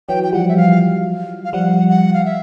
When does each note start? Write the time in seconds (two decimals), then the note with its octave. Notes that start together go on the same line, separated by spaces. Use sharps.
0.09 E3 F#3 G5
0.24 G5
0.33 F3 G3 F#5
0.49 E5
0.57 F5
1.45 F5
1.53 F3 G3 F#5
1.89 F#5
2.14 F5
2.25 E5